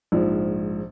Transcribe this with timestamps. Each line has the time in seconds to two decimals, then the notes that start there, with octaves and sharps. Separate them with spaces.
0.12 A#1 G#2 F3